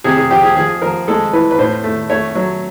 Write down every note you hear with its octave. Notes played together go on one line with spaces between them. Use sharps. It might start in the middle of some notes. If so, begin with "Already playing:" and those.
C3 G#4
G#4
F3 G4
G#4
F3 G#4
F3 A#4
G#3 A4
E3 B4
B4
A2 C5
A3
A3 C#5
F#3